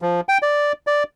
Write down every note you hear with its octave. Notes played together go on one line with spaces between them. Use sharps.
F3
G5
D5
D5